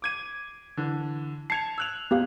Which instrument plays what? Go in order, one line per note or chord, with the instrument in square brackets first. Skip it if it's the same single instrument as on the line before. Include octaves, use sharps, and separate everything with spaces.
[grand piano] D6 G#6 D#7
D3 E3
[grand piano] A5 G#6 F7 [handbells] C7 C#7
[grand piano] E6 F#6 F7
[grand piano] A1 [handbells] B3 G4 F5